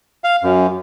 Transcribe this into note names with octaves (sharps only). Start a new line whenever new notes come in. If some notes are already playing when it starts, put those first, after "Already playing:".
F5
F#2